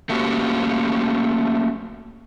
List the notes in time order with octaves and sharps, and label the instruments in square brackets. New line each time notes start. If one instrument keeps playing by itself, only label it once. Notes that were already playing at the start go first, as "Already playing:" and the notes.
[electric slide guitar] A3 A#3 C#4 F#4 G4